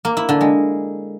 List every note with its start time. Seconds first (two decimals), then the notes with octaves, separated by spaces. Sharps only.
0.05 A#3
0.17 E4
0.29 D3
0.41 G#3